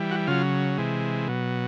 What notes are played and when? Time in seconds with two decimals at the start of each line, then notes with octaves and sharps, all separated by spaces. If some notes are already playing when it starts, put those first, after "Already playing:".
Already playing: E3 G3
0.11 F#4
0.27 C#3 F#3 F4
0.78 C3 E3 G#3
1.28 B2 F#3